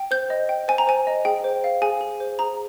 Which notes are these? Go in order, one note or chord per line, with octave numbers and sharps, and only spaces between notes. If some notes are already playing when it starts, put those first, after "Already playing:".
Already playing: G5
C5 G6
D#5
G5
C5 G#5
A#5
C5 G#5
D#5
G#4 G5
C5
F5
G#4 G#5
G#4
C5
G#4 A#5